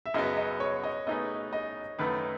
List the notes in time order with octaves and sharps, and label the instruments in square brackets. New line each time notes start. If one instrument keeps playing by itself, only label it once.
[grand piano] E5
[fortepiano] F#2 C#3 F#3 B3 [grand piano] D#5
[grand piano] D#5
C#5
D#5
[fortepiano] B2 A3 D#4 G#4 B4 [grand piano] D#5
[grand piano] D#5
[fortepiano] F#2 D#3 A3 [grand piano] B4